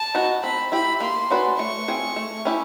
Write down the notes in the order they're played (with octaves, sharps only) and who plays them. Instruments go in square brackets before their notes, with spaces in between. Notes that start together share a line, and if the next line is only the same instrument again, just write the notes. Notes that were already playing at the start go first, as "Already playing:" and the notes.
Already playing: [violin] A5
[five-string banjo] B3 D#4 F#4
[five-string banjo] C4 [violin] B5
[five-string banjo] E4 G4 [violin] B5
[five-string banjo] A#3 [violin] C6
[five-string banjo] C#4 F#4 B4 D5
[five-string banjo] A3 [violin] C#6
[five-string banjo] C4 F4 G#4
A3
C#4 E4 G4